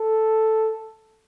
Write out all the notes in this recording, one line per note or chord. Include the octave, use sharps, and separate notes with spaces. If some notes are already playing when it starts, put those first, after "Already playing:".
Already playing: A4